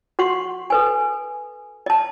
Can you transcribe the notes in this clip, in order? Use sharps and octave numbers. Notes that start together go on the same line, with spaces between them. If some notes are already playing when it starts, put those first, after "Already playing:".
F#4 F#5 C6 C#6
A4 B4 G#5
D#5 A5